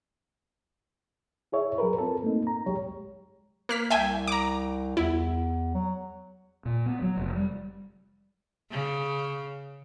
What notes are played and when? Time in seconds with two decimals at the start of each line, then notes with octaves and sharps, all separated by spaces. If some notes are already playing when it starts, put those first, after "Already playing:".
1.52 E4 G#4 C#5 E5
1.78 F#3 G#4 A#4 B4
1.98 C4 F4 A4
2.23 A3 A#3 C4 D#4
2.47 A#5
2.66 C2 F#3 G#3 G4 C#5
3.69 A#3 F6 B6
3.90 C2 E5 G5 G#5
4.27 A#5 D6
4.97 E2 E4
5.74 F#3
6.66 A#2
6.86 B3
7.02 F#3
7.17 F1
7.36 G3
8.71 C#3